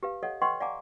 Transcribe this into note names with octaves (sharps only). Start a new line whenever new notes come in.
G4 B4 F5
A4 C#5 D#5 F5 F#5
B4 D#5 F#5 G5 C6 C#6
D5 F5 F#5 G#5 A#5 D6